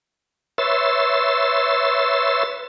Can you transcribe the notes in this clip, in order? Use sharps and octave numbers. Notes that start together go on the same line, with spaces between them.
B4 C#5 E5 C6 E6 A6